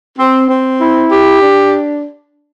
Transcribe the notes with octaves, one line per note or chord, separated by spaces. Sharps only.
C4
C4
E4
G4
D4